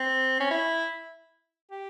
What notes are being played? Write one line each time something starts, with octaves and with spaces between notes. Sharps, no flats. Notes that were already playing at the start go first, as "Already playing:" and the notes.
Already playing: C4
C#4
E4
G4